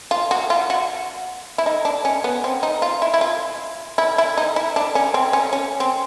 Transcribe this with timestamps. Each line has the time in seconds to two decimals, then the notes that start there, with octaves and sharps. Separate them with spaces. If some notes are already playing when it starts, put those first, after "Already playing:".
0.11 F4
0.31 F#4
0.50 F4
0.70 F#4
1.58 E4
1.66 D#4
1.85 D4
2.05 C#4
2.24 B3
2.44 C4
2.63 D#4
2.82 F4
3.02 E4
3.14 E4
3.21 F4
3.98 E4
4.18 E4
4.37 D#4
4.56 E4
4.76 D4
4.95 C#4
5.14 C4
5.33 C#4
5.53 C#4
5.80 C4